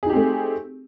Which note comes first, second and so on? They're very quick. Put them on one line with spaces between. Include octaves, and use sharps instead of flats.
G#4 D#4 G4 C4 A3